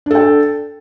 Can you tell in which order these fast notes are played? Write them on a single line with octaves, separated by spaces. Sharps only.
D4 A4 G5